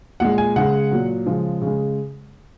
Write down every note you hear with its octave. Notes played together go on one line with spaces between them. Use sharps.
A#2 G#3 F#5
G#5
C#3 G#3 F#5
A#2 F#3
C#3 F3 G#3
C#3
G#3